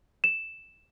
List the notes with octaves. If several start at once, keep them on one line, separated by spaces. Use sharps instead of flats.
E7